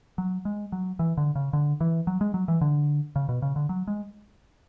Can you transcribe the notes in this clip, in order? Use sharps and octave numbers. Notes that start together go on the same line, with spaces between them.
F#3
G#3
F#3
E3
D3
C#3
D3
E3
F#3
G#3
F#3
E3
D3
C#3
B2
C#3
D3
F#3
G#3